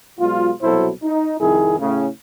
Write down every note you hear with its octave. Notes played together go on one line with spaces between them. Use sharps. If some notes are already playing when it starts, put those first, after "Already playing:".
B2 F#3 G#3 F4
C2 B2 F#3 E4 A4 C5
D#4
C2 F2 D#3 E4 G#4
A2 C#3